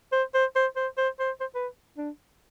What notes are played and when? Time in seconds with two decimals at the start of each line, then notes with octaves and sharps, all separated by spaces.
0.12 C5
0.34 C5
0.56 C5
0.76 C5
0.98 C5
1.20 C5
1.41 C5
1.55 B4
1.97 D4